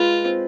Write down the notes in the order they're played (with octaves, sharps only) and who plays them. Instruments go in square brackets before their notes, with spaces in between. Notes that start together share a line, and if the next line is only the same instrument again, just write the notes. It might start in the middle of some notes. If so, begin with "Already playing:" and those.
Already playing: [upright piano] G#3 B4 [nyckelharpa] F4
[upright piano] C4